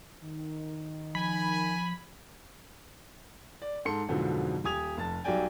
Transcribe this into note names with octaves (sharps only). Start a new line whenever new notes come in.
D#3
F3 G#5 B5
D5
G#2 A4 C6 C#7
F2 G#2 B2 D3 F3 F#3
D#1 G4 G#5 D#6 G#6 F7
F1 A5 A6
B1 F#3 G3 D5 G5 G#5